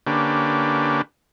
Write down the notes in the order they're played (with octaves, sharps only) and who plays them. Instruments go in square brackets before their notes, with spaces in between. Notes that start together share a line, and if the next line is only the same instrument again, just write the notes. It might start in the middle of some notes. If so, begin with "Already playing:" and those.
[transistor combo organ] D3 A#3 C#4 D4 G4 B4